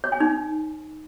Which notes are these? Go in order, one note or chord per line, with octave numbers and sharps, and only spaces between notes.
C#5
G#5
D#4